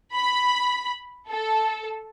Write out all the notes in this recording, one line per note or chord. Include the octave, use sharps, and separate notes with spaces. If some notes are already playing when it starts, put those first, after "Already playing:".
B5
A4